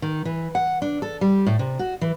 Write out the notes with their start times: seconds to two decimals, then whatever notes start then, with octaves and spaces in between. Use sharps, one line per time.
0.02 D#3
0.25 E3
0.55 F#5
0.82 D4
1.02 A4
1.21 G3
1.46 A2
1.59 C3
1.79 F#4
2.01 E3